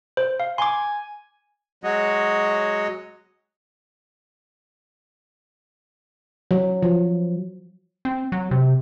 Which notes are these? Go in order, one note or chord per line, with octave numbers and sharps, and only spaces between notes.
C5
F5
G#5 C6 D6
F#3 G#3 F#4 C#5 D#5
F#3
F3
C4
F#3
C3